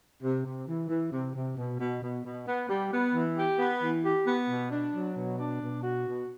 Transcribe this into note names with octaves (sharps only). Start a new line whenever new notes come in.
C3
C3
E3
E3
C3
C3
B2
B2
B2
B2
B3
G3
B3
E3
G4
B3
E3
G4
B3
B2
D4
F#3
B2
D4
B2
F#4
B2